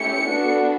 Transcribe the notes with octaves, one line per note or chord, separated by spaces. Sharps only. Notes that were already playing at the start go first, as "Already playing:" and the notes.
Already playing: A3 C#4 E4 G4 C#7
B3 D4 F#4 A4